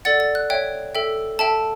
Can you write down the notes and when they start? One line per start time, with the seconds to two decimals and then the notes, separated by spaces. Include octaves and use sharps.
0.05 A4 D5 F#5 A6
0.20 A6
0.35 F#6
0.50 C#5 E5 G5
0.95 A4 E5 G5
1.39 A4 E5 G5 A5